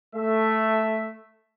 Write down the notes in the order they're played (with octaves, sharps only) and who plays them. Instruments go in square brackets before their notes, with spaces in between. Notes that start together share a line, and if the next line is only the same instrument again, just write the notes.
[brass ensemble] A3 E5